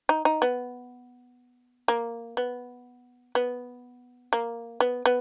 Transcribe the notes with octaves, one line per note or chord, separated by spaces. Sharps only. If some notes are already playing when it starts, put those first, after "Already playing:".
D#4
D#4
B3
A#3
B3
B3
A#3
B3
B3